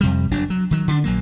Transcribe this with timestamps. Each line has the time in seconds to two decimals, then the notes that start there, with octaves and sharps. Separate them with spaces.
0.01 F2 C3 G3
0.31 F#1 F#3 D4
0.50 F#3
0.71 D#3 F#3
0.88 D3 D4
1.04 A#1 F#3 A#3